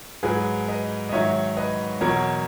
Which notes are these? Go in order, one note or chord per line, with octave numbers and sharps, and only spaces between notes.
G#2 F#3 G#4 B4
B4 D#5
D#5
G#2 D#3 F#3 C#5 E5
B4 D#5
E2 B2 F#3 A#4 C#5